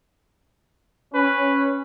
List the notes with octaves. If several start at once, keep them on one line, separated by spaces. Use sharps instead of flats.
C#4 B4